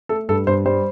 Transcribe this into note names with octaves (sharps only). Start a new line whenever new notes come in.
A3 A4
G2 A4
G2 C5
G3 C5